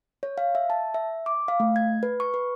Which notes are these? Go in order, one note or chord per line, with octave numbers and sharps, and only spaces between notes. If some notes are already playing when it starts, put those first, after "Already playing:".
C#5
F5
E5
A5
E5
D6
F5
A3
G#6
B4
C#6
B4